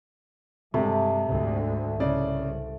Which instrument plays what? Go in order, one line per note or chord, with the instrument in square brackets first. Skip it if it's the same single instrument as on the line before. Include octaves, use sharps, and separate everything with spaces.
[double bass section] G2 G#3 [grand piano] C3 [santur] A3
[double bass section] D2 G#2 D3
[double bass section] C2 [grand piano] C#3 D5